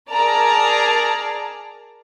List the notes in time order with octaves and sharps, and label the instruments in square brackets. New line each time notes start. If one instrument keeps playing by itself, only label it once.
[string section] G#4 A#4 D5 A5 A#5